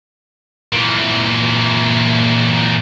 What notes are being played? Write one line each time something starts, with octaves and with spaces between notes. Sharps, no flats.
A#2 E3